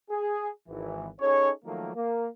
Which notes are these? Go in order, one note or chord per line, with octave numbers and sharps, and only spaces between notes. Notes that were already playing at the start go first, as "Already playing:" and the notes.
G#4
G#1 E3
C#4 D#4 G#4 A4 C#5
D#3 F3 F#3 A3 A#3
A#3